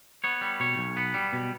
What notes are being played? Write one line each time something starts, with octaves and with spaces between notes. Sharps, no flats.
B3 C#5
G3
B2 C#5
B1
B3
G3
B2